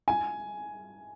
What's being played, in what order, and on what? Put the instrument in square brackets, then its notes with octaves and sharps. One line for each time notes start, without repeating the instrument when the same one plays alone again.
[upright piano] G#5